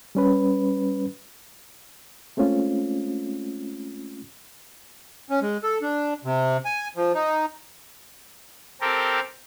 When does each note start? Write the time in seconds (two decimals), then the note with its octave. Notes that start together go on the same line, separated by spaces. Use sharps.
0.15 G3 C#4 B4
2.37 G#3 A3 C4 C#4 F4
5.30 C#4
5.42 G#3
5.63 A4
5.82 D4
6.24 C3
6.65 G#5
6.96 F3
7.15 D#4
8.81 C4 G4 A4 A#4